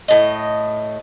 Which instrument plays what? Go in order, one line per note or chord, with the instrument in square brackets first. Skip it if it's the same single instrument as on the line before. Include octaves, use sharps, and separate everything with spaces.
[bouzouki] A2 D#5